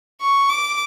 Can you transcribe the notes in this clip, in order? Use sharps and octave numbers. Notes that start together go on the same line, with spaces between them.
C#6
D6